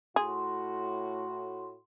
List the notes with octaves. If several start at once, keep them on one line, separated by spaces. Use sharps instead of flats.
A2 F#4 G#4 C6